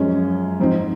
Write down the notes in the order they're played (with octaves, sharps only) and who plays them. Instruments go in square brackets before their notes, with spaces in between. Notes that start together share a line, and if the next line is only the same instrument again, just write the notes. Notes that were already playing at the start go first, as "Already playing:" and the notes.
Already playing: [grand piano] F#2 F3 G#3 C#4
G#2 F3 C4 D#4